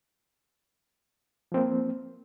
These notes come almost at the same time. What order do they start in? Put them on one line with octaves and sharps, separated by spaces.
F3 C4 A#3